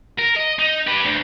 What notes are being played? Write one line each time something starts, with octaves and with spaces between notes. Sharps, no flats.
A#4
D#5
D#4
G4 B4
D2